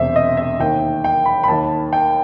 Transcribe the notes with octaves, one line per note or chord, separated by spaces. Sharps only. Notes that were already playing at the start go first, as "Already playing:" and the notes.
Already playing: E1 E2 C3 C5 E5
D#5
E5
D#2 D#3 G5
G5
B5
B5
D#2 D#3 A5
G5